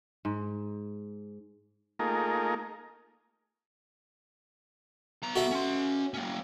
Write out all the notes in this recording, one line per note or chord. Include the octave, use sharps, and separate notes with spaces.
G#2
A3 A#3 D#4 F4 G#4 A#4
B3 A#5
F#4 A4 E5
C#4 C6
A#3 C#4